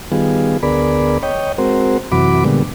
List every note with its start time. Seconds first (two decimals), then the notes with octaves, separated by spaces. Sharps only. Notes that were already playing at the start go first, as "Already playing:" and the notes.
0.12 D#3 G3 B3 F4 G#4
0.63 D2 B3 G#4 A#4 D5 B5
1.23 C#5 D#5 G5
1.58 G#3 C4 F#4 A#4 C5
2.12 F#2 C3 E3 F#4 B5 D6
2.44 A#2 D3 G3 G#3 B3